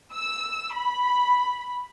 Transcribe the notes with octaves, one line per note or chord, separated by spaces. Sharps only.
E6
B5